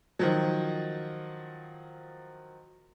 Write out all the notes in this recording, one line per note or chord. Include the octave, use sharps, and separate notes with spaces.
D#3 F3 F#3